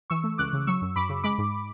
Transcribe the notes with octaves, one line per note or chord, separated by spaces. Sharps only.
E3 C#6 E6
A3
C#2 D6 F#6
C#3
F#3 C#6 E6
F#2
F#2 B5 D6
C#3
G#3 B5 D6
G#2